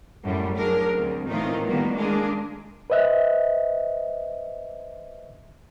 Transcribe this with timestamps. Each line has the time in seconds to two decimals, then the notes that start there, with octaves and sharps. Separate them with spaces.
0.23 F#2 A2 F#3 G3
0.59 F#3 D4 G#4 A#4
0.93 D2 C4
1.28 A2 D#3 E3 C4 D#4 F4
1.65 A2 D#3 G3 A#3 B3
1.96 G#3 A#3 D4 G#4
2.90 B4 C5 D#5 E5 F#6